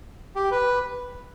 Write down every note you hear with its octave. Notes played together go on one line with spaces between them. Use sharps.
G4
B4